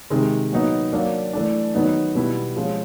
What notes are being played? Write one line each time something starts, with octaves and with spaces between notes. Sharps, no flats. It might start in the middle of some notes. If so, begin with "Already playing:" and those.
C3 D#3 G#3
A#2 F#3 B3 D#4
F#3 A#3 D4
E3 A3 D4
D#3 F#3 B3 D#4
B2 G3 B3 E4
F3 G#3 C#4